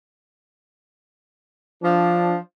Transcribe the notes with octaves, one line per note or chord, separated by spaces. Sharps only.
F3 D4